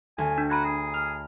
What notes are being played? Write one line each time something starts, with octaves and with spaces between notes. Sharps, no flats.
D2 G#5
D4
F#4 A#5 B5 G#6
G#4
F6